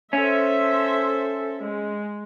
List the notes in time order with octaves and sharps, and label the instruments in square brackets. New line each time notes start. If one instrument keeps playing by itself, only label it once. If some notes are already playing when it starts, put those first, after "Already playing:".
[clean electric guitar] C#4 [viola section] A4 C5 E5
[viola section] G#3